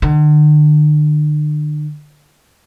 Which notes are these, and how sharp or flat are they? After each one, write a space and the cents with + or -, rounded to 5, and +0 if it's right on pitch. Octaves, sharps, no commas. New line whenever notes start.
D3 +40